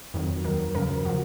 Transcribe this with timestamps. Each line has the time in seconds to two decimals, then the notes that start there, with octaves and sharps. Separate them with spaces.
0.14 F2 D#3 F#3
0.44 D#2 D#3 F#3 A#4
0.75 F#2 C#3 F3 A#4
1.05 C#3 F3 F#4